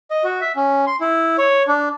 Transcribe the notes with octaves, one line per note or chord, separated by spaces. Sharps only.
D#5
F#4
E5
C#4
C6
E4
C#5
D4